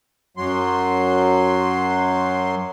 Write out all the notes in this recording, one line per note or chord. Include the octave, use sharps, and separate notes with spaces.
F#2 F#3 C6